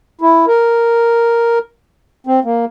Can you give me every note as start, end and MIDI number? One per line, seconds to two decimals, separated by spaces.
0.21 0.46 64
0.47 1.59 70
2.27 2.40 60
2.45 2.65 58